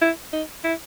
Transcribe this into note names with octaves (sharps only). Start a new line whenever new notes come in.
E4
D#4
E4